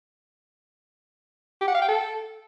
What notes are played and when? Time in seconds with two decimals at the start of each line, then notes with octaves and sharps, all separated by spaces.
1.61 G4
1.68 F#5
1.74 F5
1.81 G5
1.88 A4